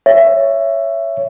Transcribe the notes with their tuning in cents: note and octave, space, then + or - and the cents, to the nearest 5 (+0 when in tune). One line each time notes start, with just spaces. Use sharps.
C#5 +5 E5 +15